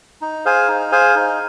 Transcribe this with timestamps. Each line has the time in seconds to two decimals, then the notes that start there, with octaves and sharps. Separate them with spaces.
0.22 D#4
0.45 G#4 C5 F5 G#5
0.68 D#4
0.92 G#4 C5 F5 G#5
1.16 D#4